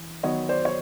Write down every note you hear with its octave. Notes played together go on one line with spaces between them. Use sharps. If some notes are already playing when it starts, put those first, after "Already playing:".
Already playing: E3
D#3 F#3 B3 C#5 D#5
C5 D5
C#5